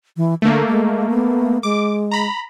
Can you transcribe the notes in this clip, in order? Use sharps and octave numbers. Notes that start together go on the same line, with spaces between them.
E3
D3 A3 A#3
G#3
B3
G#3 D6
A#5 B5